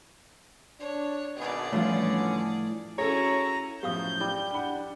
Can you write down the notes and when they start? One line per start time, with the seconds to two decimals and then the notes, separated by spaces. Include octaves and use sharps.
0.80 D4 C#5
1.36 G#1 B2 G#4 D5
1.73 A2 D3 E3 F3 G3 B3 C#4 F4
2.98 C#4 E4 F#4 G#4 A4 C#5 A#5
3.83 F#2 A2 F3 G4 F5 D#6 G6
4.20 G3 E4
4.54 D4 F#5 B5 G7